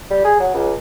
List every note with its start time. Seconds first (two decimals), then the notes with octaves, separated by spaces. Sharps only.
0.10 G3
0.25 G#4
0.40 F#3
0.54 C#2